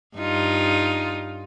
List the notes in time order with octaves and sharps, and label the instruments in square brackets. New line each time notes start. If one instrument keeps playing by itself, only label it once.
[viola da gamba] G2 D#4 F4